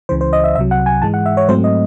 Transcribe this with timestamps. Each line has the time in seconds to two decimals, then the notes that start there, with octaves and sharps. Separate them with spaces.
0.09 C#2 C#3 E3 C5
0.21 C5
0.33 D#5
0.44 E5
0.55 C2 E5
0.58 C3 F#3
0.71 F#5
0.86 G#5
1.02 G#2 E3 G#3 A5
1.14 F#5
1.26 E5
1.37 C#5
1.48 G#2 F#3 A3 C4 C5
1.64 D#5